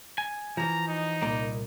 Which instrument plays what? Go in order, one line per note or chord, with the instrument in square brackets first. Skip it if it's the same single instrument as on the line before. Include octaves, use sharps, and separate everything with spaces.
[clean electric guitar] G#5
[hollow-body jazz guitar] E3 F3 [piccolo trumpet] A#5
[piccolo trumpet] D#4
[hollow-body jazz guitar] C2 A#2 [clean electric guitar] A#3